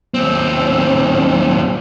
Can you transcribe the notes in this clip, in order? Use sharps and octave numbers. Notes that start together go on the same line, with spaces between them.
D#2 C4